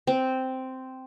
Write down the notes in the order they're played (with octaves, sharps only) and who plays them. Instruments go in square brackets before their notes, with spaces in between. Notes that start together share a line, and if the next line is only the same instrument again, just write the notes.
[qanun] C4